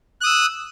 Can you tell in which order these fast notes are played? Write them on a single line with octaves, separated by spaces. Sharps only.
F#6 D#6 E6